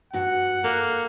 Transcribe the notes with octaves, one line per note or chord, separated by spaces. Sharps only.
G2 F#4 F#5
A#3 A4